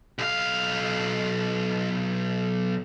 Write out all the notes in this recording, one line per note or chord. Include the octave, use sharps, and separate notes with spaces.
B1 F5